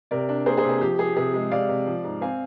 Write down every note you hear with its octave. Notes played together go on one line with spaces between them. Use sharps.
C3 A#4 D5
D4
A#3 G#4 C5
G#4 C5
C3
G#4
F3 G4
F3 G#4
C3 G#4
G#3
C3 D5 F5
C3
F3
G#2
C4 F5 G#5